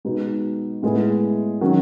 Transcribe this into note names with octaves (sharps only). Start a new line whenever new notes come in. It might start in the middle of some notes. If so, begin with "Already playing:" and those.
B2 G#3 B3 D#4 F#4
A2 G#3 B3 E4 G#4
D#3 F#3 C#4